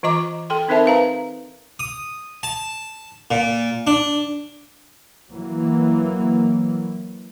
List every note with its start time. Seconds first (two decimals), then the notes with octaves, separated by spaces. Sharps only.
0.03 E3 F4 D#5 A#5 D6
0.50 A4 G5 C6
0.68 C4 D#4 A#4 C5 E5 A5
0.86 B4 F5 A#5
1.79 D#6
2.43 A5
3.31 A#2
3.87 D4
5.31 E3 F#3 A#3